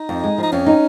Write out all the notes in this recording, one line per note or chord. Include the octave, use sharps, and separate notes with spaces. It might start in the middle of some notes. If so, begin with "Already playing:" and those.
Already playing: D#4
F2
G#3
F3 D#4
F2 C#4
D#4